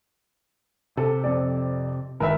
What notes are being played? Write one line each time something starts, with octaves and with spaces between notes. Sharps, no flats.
C3 A4
F2 D5
G1 G#2 D#3 A#4 B4 E5